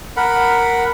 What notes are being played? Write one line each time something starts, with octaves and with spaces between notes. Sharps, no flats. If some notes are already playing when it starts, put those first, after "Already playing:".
A#4 F#5 B5